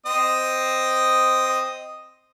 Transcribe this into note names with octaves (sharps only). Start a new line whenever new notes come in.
C4 D#5 D#6